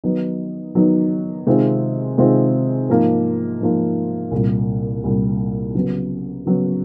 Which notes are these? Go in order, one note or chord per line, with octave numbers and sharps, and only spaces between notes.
D#3 F#3 B3 D#4
D#3 F#3 B3 D#4
C3 D#3 G#3 C4 F4
C3 D#3 G#3 C4 F4
G#2 F3 A#3
G#2 F3 A#3
C2 A#2 G3
C2 A#2 G3
C#3 F#3 B3
C#3 F#3 B3